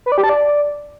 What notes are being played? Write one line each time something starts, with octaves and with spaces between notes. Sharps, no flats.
B4
D5
G4
A5
D5